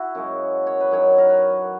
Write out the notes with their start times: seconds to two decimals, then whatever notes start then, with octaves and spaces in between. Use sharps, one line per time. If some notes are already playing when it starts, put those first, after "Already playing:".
Already playing: E4 F#4
0.15 F#2 C#3 G#3
0.67 C#5
0.81 B4
0.91 F#2 D#3 F#3 C#5
1.18 A#4
1.29 B4